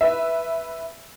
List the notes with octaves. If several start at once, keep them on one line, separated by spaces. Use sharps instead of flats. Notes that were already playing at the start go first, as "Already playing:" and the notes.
B4 E5